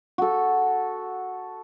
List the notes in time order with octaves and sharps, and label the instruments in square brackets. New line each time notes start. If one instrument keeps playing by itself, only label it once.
[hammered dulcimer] F#4 A4